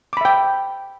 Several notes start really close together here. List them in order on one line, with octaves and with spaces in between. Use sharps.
D6 B5 E5 G5